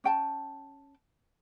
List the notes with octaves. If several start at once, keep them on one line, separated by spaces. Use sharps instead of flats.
C#4 G5 A5